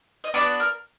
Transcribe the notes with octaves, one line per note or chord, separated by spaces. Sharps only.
D#5
B3 D4 F#4 D5
A#4